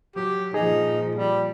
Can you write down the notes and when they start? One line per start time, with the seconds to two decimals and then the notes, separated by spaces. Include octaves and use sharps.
0.16 F#3 G4
0.54 G2 A#2 F3 D#4 G#4
1.15 G3